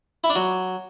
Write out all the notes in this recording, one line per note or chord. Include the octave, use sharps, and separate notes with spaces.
E4
D4
F#3